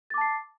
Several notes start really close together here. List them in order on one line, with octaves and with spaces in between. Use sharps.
A6 D6 A5 C7